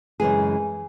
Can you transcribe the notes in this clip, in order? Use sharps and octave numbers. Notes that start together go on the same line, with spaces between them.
F#2 C#3 E3 G#3 G#4